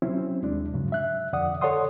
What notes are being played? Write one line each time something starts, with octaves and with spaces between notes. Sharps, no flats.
F#3 C4 C#4 E4
D#2 G#3 D4
G2 C#3 F#3
E5 F#6
F2 D3 D5 F#5 D#6
A4 C#5 D5 F#5 C6 D#6